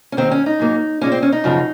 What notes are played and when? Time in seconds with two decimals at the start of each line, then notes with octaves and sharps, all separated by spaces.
0.12 C#4
0.17 D#2 D#3 G#3 C4
0.31 C#4
0.46 D#4
0.59 G#2 F#3 A#3
1.01 A#2 G#3 C#4
1.12 C4
1.23 C#4
1.32 D#4
1.44 F#2 C#3 F3 G#3